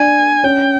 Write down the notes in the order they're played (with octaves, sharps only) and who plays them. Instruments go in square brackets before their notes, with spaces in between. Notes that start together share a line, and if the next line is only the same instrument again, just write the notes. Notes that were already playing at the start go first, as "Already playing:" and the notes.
Already playing: [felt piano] D4 [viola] G#5
[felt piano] C#4 [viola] G5